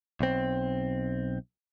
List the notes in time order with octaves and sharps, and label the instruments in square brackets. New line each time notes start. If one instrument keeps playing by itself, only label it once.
[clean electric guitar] B1 C4